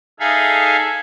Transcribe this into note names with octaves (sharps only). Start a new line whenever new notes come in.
D#4 G#4 A4 E5 F5 G#5